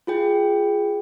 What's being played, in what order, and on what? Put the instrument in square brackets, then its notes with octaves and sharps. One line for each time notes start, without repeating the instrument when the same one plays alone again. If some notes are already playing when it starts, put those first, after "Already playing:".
[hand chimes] F4 G#4 G5